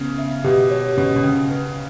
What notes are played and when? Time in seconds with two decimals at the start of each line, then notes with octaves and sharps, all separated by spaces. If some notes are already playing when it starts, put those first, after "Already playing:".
Already playing: C#3 B3
0.18 E5
0.44 B2 G4
0.71 C#5
0.97 B2 C#4
1.16 B2
1.23 C#3 G5
1.51 B4